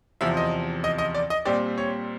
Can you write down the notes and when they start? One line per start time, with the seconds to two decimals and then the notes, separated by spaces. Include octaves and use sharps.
0.21 E2 C3 F3 E5
0.37 D#5
0.84 D#5
0.98 D#5
1.15 D5
1.30 D#5
1.45 A#2 G3 C4 D5
1.78 C#5